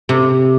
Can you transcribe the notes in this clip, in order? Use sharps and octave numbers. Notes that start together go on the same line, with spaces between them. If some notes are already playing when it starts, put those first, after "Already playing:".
C3